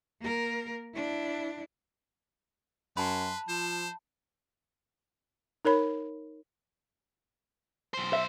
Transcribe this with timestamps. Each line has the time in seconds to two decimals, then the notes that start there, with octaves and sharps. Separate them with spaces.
0.20 A#3 A#4
0.94 D4 E4
2.97 F#2 B4 A5 B5 C6
3.49 F3 C5 E7
5.65 D#4 A#4 C#5 B5
7.94 B1 C5
8.13 E5